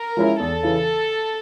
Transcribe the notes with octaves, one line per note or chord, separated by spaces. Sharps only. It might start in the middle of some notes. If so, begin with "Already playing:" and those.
Already playing: A#4
F3 G#3 C#4 E4
E2 A4
C#3 E3